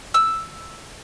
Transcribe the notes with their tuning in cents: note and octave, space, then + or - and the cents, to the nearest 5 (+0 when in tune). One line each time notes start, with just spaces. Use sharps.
E6 +0